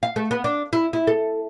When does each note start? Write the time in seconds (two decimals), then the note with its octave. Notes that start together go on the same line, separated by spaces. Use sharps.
0.03 F5
0.16 A3
0.31 B3
0.44 D4
0.73 E4
0.93 E4
1.07 A4